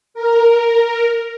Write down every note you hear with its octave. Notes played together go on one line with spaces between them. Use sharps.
A#4